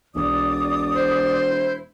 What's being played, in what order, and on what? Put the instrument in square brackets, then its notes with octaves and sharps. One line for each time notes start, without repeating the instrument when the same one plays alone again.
[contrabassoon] E1 [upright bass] B1 E4 [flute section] D5 D6 D#6
[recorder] C5
[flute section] E4